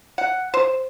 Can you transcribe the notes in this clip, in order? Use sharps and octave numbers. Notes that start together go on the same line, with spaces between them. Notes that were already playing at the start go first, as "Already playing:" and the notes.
F#5
C5